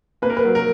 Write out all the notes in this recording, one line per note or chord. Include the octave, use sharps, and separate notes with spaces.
A#3 B4
A#4
B4
F#3
A#4